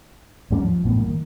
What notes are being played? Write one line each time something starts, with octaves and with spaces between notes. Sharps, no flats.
D#2 G#2 G3 C#4
F3
A1 F#2 A2 B3
G3 A#3
D#3